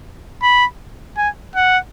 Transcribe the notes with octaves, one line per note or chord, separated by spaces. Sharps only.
B5
G#5
F#5